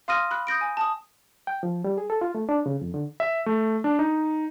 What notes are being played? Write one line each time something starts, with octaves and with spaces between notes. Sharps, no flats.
F5 C6 D#6 F6 A#6 D#7
B5 F#6
D#6 G6 A#6 D7
G#5
A5 D#6
G5
F3
G3
G#4
A4
F4
A3
D4
C#3
F2
D3
E5
A3
D4
D#4